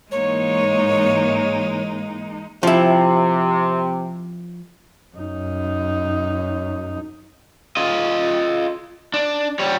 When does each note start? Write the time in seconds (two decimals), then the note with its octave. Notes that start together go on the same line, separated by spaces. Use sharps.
0.12 G#2 E3 G#3 A#3 D#4 C#5
2.63 C3 F3 E4
5.16 F#2 D#4
7.76 F4 D#5
9.14 D4
9.59 G3 C#5